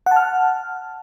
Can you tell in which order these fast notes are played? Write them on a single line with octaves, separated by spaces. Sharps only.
F#5 A5 F6